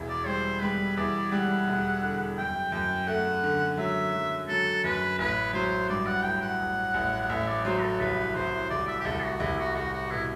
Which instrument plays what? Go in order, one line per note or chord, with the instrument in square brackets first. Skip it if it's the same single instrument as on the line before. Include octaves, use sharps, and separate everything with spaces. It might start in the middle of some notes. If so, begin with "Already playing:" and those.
Already playing: [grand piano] E1 E2
[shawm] D5
[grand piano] G3 [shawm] C5
[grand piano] G3 [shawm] B4
[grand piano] E2 [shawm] D5
[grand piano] G3 [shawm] F#5
[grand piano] E1
D3
[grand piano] F#2 [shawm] G5
[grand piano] F#2 [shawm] G5
[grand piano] A3 [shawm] F#5
[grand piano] D3
[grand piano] F#3 [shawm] E5
[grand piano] F#3
[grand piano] F#3 [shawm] A4
[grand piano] F#2 [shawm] B4
[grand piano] A1 [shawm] B4
[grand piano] F#3 [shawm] C5
[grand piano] G2 [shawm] D5
[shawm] F#5
[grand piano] A1 [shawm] G5
[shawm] F#5
[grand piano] A1
A1
[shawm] F#5
[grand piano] A1 [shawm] E5
[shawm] D5
[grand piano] F#3 [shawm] C5
[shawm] A4
[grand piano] C2 [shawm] B4
[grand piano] C2 [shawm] C5
[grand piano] C2 [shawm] D5
[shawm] E5
G4
[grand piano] C2 [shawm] A4
[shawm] F#4
[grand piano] C2 [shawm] E4
[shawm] F#4
[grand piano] C2 [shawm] F#4
[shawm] F#4
[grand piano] B2 [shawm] E4